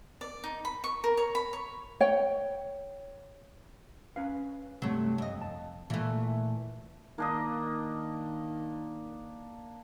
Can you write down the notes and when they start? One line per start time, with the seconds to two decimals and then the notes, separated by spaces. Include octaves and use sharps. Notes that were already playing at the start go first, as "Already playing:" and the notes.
0.21 D5
0.44 D#4
0.65 B5
0.84 C#6
1.04 A#4
1.17 C#5
1.35 B5
1.53 C#5
2.01 C#5 G5
4.16 C#4 B4 F5
4.82 G2 C3 F#3 A3
5.18 F2 D#5
5.41 A5
5.90 A#2 E3 A3
7.18 D#3 A#3 D4 D#5